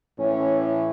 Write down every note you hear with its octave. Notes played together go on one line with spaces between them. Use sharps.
A2 E3 C#4